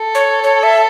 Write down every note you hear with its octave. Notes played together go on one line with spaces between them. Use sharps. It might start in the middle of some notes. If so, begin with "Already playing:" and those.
Already playing: A4
C#5
C#5
E5